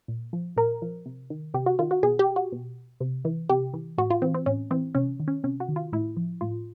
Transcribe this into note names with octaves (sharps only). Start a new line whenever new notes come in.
A#2
F3
A#2 A#4
F3
C3
D#3
C3 G4
F#4
D#3 F4
F#4
B2 G#4
G4
F#4
B2
C3
E3
C3 G4
E3
A2 F#4
F4
E3 C4
C4
A2 C#4
E3 C4
C3 C#4
D#3
C#4
C3 C#4
F#4
D#3
F4
A2 E4
F3
A2 F4